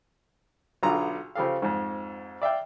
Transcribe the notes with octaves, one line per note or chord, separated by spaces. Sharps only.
B1 D3 F4 G#4 A#5
C#3 F3 G4 A4 F5
F2 G#2
D5 E5 F5 G5